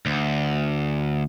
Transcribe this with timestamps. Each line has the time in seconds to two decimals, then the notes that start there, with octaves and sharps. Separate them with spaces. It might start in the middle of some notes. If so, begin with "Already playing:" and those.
0.06 D2